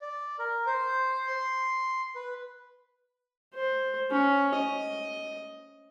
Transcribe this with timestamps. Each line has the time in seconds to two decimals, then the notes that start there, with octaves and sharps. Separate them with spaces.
0.02 D5
0.39 A#4
0.67 C5
1.27 C6
2.16 B4
3.54 C5
4.11 C#4
4.55 D#5